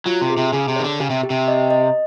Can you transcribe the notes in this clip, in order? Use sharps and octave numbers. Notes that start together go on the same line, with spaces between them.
F#3 F4
C3
G#4
C3
C#3 G#4
C3
D#3 C#5
D3
C#3 G4
C3
G4
C3
D#5
D#5